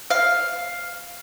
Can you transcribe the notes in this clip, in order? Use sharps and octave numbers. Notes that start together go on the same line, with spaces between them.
F5